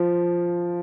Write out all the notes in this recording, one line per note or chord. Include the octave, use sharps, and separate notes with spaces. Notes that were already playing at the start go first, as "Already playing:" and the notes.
Already playing: F3